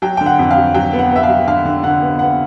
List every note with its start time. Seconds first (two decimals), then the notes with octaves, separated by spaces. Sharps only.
0.02 F#3 G5
0.17 D3 G5
0.26 F#5
0.39 F2
0.51 F5
0.57 F#3
0.74 F#3 G5
0.93 B3
0.99 F#5
1.12 B3 E5
1.23 F5
1.29 F#3
1.47 D3 F5
1.65 D3
1.83 D3 F#5
2.02 B3
2.19 B3 F#5